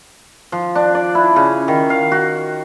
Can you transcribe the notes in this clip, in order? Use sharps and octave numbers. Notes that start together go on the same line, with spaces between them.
F3
D4
D5
E4
C#3
D#3
F5
F#4